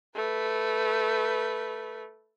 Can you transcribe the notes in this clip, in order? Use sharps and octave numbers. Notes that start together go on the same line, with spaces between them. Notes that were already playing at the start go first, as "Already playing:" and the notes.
A3 B4